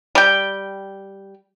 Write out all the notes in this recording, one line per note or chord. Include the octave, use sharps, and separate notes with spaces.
G3 G5